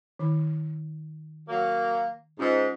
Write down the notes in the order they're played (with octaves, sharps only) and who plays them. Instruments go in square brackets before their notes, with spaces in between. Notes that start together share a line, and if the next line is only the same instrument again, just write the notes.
[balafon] D#3 E4 B5
[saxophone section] F#3 A#3
[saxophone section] G#2 [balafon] C#4 F4